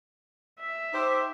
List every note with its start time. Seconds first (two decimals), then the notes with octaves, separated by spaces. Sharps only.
0.60 E5
0.93 D#4 G4 C5